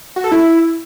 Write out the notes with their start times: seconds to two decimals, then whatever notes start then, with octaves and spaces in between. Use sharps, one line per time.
0.16 F#4
0.24 A4
0.32 E4